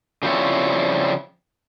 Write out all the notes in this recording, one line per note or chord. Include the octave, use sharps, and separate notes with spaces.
C#3 F3 G3 C4 E4 C#5